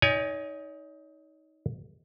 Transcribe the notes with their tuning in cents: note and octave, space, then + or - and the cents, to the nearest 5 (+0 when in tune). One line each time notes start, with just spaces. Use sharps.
D#4 +20 C#5 +40 G#5 -10